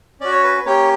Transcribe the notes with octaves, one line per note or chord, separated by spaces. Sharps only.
C#4 F#4 D5
C#5
B4
B4
A#3 C#4 G4 C#5